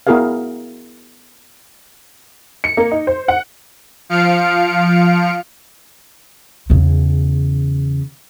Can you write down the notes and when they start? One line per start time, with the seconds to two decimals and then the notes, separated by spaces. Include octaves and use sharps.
0.07 B3 E4 F#4 G#4 A#4 F5
2.64 C#7
2.77 A#3
2.92 D#4
3.07 C5
3.28 F#5
4.09 F3 F5 F6 C#7 D7
6.70 E2 C#3